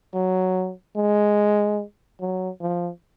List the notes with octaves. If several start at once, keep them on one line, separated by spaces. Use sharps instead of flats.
F#3
G#3
F#3
F3